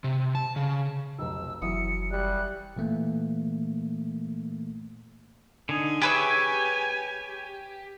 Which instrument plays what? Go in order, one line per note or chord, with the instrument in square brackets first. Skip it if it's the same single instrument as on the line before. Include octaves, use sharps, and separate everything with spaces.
[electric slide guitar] C3
A5
C#3
[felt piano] F1 B1 [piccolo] E6
[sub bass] F#1 [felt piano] E3 F#3 D#6 [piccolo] C#7
[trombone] G3 [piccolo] F#6
[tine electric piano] A#2 E3 A3 A#3
[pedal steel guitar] D3 D#4 [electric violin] G#5
[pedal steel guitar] G4 E5 [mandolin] G#4 B4 C#5
[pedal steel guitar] G4